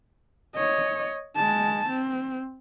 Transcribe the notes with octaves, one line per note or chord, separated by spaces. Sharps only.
C#5 D#5
G#3 A5
C4